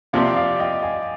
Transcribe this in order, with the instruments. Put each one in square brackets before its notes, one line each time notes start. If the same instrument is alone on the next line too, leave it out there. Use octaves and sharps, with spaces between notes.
[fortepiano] C3 F3 C4 G4 [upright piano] D5 F5
[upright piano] D5 F5
D#5 G5
F5 G#5